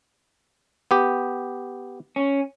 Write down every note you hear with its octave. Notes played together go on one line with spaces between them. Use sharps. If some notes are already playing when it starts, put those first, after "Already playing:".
B3 G4
C#4